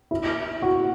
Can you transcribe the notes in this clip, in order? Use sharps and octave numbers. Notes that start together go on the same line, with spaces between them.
E4
F#4